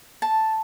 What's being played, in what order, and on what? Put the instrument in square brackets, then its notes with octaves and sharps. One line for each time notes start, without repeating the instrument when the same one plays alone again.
[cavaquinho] A5